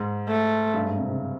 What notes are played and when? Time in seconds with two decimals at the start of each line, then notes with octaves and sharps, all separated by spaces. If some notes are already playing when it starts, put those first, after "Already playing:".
Already playing: G#2
0.28 A3
0.74 G2
0.85 G#2
0.97 C3
1.09 C#3